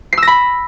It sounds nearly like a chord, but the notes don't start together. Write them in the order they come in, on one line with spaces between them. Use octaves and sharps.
C7 E6 A#6 B5